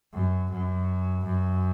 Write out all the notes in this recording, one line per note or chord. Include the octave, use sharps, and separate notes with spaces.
F#2
F#2
F#2